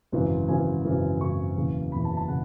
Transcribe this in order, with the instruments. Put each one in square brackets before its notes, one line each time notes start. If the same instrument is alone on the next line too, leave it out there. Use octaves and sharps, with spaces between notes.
[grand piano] G#1 F#2 C#3 E3
G#1 F#2 C#3 E3 G#5
G#1 F#2 C#3 E3
G#1 F#2 C#3 E3 C#6
F#1 E2 C#3
F#1 E2 C#3 B5
A5
A5
C#3 F#5